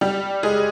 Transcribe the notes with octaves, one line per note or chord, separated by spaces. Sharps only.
G3 G4
G#3 G#4